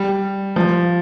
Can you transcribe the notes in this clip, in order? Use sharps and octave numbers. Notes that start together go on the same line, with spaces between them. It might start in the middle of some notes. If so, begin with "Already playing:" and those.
Already playing: G3
F3